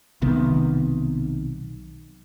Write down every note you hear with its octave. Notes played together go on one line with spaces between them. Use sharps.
B1 C3 D#3 B3